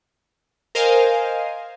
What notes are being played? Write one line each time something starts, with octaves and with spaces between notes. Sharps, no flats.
A#4 C5 D#5 F5 G#5